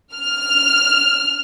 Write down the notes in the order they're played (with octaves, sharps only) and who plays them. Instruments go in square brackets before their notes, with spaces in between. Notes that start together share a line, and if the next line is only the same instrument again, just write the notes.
[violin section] F6